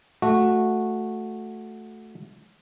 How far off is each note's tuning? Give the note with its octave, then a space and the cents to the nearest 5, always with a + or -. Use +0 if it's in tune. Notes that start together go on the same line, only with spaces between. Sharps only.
A3 -5 F#4 -10